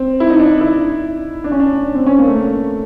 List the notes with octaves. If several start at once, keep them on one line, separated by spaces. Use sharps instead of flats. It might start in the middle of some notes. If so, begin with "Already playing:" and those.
Already playing: C4
E4
D#4
D4
E4
D4
C#4
D4
C4
C#4
A#3
A3